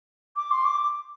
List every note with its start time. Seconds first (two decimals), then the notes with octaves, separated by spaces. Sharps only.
0.36 D6
0.51 C6
0.65 D6